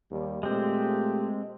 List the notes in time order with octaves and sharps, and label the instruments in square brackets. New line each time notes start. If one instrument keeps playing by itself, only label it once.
[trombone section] D#2 D#3 G3
[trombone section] A#2 A3 G4 [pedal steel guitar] G#3 C4